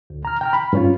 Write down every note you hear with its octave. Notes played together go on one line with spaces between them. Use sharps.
D2
A#5 F6
G5 A#5 F6
B5
G2 C#4 F4